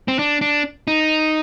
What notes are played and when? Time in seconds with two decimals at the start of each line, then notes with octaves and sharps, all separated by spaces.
0.08 C4
0.19 D4
0.41 D4
0.88 D#4